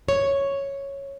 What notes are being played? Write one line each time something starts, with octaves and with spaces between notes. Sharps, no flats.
C#5